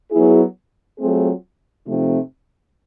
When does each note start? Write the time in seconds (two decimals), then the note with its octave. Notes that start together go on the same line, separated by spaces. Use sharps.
0.11 F#3 B3 E4 G#4
0.99 F#3 A3 C4 F4 G#4
1.87 C3 F3 A3 C4 D#4